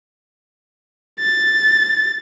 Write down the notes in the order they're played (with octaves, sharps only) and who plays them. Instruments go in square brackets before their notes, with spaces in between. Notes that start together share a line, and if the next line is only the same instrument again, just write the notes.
[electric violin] A6